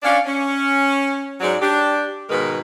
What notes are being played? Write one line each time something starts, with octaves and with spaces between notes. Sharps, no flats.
C#4 D4 F5
C#4
G#2 F#3 D5
D4 G4
G#2 B2 D#3 G#3 A#4 B4